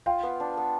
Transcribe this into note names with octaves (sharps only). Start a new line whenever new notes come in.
F4 F5 G5
B3
D4
B3